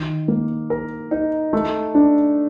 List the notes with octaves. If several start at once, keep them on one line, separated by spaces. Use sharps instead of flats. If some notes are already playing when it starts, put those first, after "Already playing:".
Already playing: D#3
A#3
A#4
D#4
A3
D4